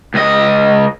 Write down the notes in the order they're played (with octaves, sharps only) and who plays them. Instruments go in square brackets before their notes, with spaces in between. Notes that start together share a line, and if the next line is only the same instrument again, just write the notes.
[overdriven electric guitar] C#2 D#5